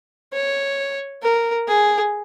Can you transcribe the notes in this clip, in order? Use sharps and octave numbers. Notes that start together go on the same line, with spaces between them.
C#5
A#4
G#4